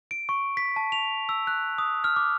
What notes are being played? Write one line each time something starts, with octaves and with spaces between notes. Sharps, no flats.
D7
C#6
B6
A5
F7
E6
F#6
D#6
F6
D6